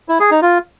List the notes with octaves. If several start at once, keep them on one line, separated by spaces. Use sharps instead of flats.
E4
G#4
D#4
F4